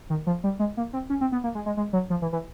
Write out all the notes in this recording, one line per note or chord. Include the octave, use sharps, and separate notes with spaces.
D#3
F3
G3
G#3
A#3
C4
C#4
C4
B3
A#3
G#3
G#3
G#3
F#3
F3
E3
E3